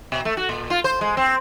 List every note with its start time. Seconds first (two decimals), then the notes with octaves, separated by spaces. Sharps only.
0.12 B2
0.25 A3
0.37 F#4
0.49 A#2
0.70 F4
0.84 C5
1.01 G#3
1.17 C4